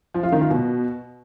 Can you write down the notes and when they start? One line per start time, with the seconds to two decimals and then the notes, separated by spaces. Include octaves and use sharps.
0.14 F3
0.23 F4
0.32 D#3
0.41 F4
0.50 B2